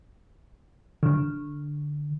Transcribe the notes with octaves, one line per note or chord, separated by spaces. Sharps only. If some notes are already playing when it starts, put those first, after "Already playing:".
D3